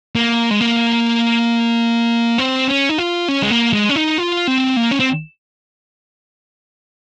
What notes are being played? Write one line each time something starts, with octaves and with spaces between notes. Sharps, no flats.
A#3
G#3
A#3
C4
C#4
D#4
F4
C#4
G#3
A#3
G#3
C#4
D#4
F4
C4
A#3
C#4
C4